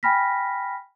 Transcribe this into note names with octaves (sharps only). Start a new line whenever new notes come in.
G5 G#5 B5 F6 A#6 B6